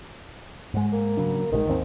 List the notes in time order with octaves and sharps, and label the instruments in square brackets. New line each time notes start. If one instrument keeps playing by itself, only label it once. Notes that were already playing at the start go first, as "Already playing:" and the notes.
[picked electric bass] G#2 G#3
[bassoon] A#3
[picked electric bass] C#3 F#3 D4
[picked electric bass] A#1 E3 G#3 [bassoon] D#3
[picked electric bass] G#1 D#2 C4